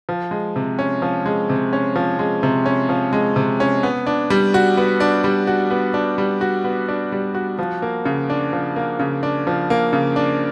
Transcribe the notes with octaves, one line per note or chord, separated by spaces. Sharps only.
F3
G#3
C3
C#4
F3
G#3
C3
C#4
F3
G#3
C3
C#4
F3
G#3
C3
C#4
B3
D4
G3
F#4
B3
D4
G3
F#4
B3
D4
G3
F#4
B3
D4
G3
F#4
F3
A#3
C#3
D4
F3
A#3
C#3
D4
F3
A#3
C#3
D4